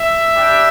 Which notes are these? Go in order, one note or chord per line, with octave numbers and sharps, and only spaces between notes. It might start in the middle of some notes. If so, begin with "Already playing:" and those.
Already playing: E5
G3 D4 G4